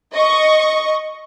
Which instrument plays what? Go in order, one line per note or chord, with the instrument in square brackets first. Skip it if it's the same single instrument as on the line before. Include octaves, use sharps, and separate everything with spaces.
[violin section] D#5 C#6